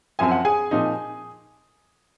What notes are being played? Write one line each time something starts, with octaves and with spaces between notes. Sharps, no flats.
F#2 F3 C4 G#5
F#5
G#4 G#5
A#2 F3 C4 D#4